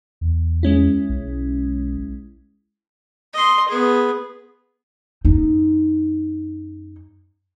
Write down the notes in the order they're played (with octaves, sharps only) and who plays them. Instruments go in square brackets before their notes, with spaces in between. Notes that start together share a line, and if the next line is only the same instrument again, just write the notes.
[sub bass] E2
[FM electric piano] G#3 C#4 E4
[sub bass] B1
[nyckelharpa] D#5 C6
B3 G#4
[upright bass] F#2 D#4